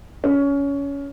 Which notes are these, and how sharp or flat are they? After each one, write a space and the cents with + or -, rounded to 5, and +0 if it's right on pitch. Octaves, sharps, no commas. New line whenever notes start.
C#4 +20